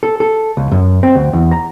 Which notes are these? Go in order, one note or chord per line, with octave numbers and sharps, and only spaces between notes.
A4
A4
C#2
F#2
C4
D2
E2
A#5